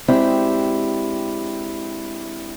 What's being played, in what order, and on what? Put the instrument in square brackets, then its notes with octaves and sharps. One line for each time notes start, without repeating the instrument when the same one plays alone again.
[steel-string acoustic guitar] G#3 C4 D4 E4 G4